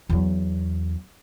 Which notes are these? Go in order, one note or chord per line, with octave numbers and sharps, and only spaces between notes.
E2 F#3